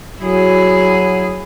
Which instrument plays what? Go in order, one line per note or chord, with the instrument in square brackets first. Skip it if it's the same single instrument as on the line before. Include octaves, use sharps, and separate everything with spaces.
[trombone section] F#3 [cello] E4 G#4